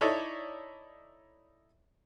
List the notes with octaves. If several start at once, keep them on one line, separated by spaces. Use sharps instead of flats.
D#4 E4 A4 C#5 D5